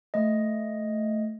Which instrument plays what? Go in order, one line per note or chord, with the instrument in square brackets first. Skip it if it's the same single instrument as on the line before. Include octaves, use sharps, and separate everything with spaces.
[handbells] A3 D#5